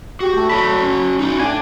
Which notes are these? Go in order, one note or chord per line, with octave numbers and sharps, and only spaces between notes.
F#4 G4
A3
F#4 C#5 A5 B5
C#4
D#4 F#4
A2 D4 D5 G#5